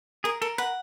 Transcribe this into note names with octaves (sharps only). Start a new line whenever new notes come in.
G#4 A#4
A4 A#4
B4 F#5